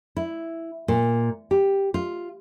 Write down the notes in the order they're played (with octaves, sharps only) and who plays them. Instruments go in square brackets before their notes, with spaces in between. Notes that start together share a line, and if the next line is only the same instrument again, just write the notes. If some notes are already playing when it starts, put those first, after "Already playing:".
[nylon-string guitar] E4
A#2
G4
F4